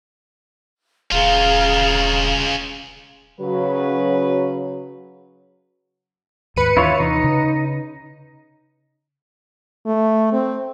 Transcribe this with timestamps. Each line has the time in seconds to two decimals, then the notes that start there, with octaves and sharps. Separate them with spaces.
1.12 D#1 C#3 F4 G#4 F5 A#5
3.40 C#3 F#3 B4
6.56 D#2 G#2 B4 C#7 D#7
6.77 D#2 E3 D4 E4 F4 C#5
7.00 C3 D#4
7.24 C#3
9.87 A3
10.33 C4